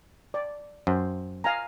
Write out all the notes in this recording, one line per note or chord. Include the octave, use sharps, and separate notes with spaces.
D5
F#2 C5
F5 G#5 A#5